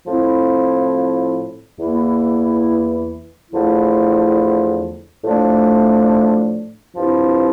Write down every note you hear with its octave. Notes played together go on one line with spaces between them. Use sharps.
A2 F3 C4 E4
E2 E3 A#3 E4
E2 D3 F3 A3 E4
A2 F3 A3 D4
G2 F3 C4 E4